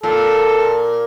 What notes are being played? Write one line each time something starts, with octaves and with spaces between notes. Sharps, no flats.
A#2 A4